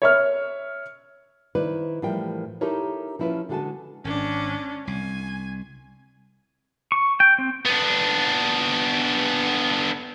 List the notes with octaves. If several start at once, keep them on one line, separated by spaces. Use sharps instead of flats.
C#5 E5 F6
D#3 E4 B4 C5 D5
A2 E3 F3 G3 A#4 G5
D#4 E4 G4 A4 A#4 C#5
F3 C#4 E4 F4 B4
D3 G#3 F#4 A4 G#5 A5
G#1 C#4 D4
C2 G#5
C#6
G5
C4
B3 D4